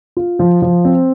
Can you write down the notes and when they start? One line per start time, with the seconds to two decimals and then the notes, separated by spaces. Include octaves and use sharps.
0.17 F4
0.39 F3
0.62 F3
0.85 C4